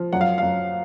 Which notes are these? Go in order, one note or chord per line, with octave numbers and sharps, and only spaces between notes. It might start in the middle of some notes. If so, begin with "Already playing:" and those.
Already playing: F3
F#2 F#5
F5
F#2 F5